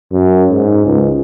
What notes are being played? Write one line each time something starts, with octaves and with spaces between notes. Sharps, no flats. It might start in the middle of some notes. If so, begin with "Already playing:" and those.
F#2
G#2
C#2